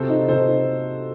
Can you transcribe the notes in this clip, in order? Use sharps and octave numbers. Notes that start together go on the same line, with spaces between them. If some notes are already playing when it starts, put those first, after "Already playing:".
Already playing: C3 F4 F#4 A4 C5
D#4
C3 A4 C5
D#4